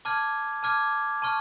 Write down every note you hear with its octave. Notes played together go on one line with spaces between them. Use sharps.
A5 D6 F6 G#6
A5 D6 F6 G#6
A5 C#6 F6